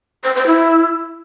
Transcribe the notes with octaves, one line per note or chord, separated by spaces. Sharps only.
C5
C5
E4